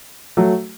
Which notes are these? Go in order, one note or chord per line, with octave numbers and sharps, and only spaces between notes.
F#3 A3